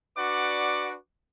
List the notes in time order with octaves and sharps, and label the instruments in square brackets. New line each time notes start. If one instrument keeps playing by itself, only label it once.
[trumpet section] D4 F#4 B4 D5 F#5 D6